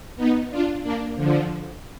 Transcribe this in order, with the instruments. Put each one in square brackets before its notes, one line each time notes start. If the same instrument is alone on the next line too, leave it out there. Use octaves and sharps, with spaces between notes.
[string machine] B3 D#4
D4 F4
A#3 D4
D3 F3